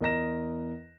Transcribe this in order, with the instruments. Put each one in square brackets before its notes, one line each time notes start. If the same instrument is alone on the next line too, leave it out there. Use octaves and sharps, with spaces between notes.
[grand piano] E2 A#4 D#5 A#5 A#6 E7